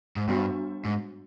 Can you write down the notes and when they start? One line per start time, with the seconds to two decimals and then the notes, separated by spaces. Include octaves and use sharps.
0.16 G#2
0.28 G2 G3 B3 D4 F#4
0.85 G#2